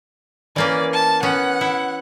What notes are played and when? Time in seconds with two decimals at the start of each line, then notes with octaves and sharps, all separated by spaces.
0.56 E3 A#3 C#4 D5
0.93 A5
1.23 B3 C#4 F#5
1.61 E4